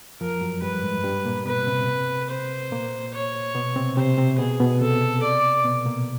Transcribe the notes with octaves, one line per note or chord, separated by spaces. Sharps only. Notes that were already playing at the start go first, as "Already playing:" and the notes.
F2 F3 A#4
F#2 F#3
G2 G3 B4
G#2 G#3
G2 G3
A#2 A#3
B2 B3 B4
C3 C4
C5
A#2 A#3
C#5
B2 B3
C3 C4
C3 C4 C5
C3 C4
B2 B3 G#4
B2 B3
C3 C4 A4
D5
B2 B3
A#2 A#3